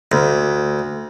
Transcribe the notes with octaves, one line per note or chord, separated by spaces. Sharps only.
D2